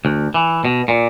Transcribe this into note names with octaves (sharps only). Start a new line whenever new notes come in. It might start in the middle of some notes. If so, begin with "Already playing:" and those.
D2
E3
B2
A#2